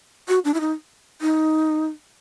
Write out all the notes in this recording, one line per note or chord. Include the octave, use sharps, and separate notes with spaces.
F#4
D4
E4
D#4
D#4